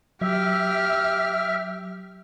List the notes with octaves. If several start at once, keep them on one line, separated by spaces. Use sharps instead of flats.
F#3 G4 E5 F6